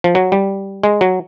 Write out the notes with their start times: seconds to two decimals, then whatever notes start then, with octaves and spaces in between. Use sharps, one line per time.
0.04 F3
0.15 F#3
0.32 G3
0.83 G#3
1.01 F#3